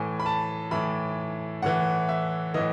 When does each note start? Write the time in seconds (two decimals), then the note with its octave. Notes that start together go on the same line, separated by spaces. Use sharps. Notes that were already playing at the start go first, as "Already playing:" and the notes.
Already playing: A2 E3 G#5
0.20 B5
0.26 A5
0.71 A2 E3 B5
1.62 A2 E3 F#5
2.09 E5
2.54 A2 E3 D#5